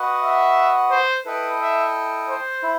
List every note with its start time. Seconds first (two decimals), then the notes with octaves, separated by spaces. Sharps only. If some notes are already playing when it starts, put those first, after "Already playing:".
Already playing: F#4 B4 D#5 F#5
0.22 E5
0.91 C5
1.25 E4 A4 B4 D#5 G5
1.60 E5
2.29 C5
2.63 E4